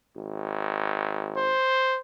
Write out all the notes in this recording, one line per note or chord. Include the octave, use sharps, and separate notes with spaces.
G#1
C5